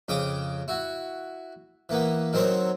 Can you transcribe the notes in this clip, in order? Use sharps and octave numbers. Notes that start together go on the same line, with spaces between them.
F2 C#3 G5 D6 D#6
E4 F#4
E3 A#3 B3
D#3 F#3 C4 A#4 C5 C#5